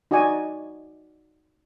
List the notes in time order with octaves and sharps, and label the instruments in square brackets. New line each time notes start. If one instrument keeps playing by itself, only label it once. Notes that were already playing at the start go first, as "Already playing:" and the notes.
[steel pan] D#4 F#4 D5 D#5 G#5